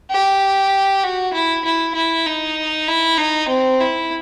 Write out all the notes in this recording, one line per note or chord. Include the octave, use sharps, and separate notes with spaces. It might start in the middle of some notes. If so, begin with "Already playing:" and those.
G4
F#4
E4
E4
E4
D#4
E4
D#4
C4
E4